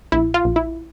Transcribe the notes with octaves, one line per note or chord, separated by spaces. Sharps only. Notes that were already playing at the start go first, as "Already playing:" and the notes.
A#1 E4
F4
A#1
E4